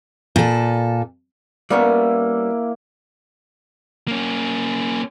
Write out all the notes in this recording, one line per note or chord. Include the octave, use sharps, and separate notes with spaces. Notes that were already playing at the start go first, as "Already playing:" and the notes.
A#2 A4
G3 A#3 B3 C#4 E4
A#3 C#4